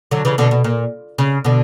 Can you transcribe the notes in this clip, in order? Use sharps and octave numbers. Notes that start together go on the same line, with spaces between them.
D3 F#3
C#3 E3
B2 D3
B2
A#2
C#3
B2 D3